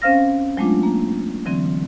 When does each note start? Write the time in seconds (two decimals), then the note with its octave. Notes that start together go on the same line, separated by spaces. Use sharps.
0.02 C4 C#4 C5 F5 F6 A#6
0.57 F#3 G#3 A3 C4 D4 F4
0.83 A#3
1.46 D3 E3 F#3 C4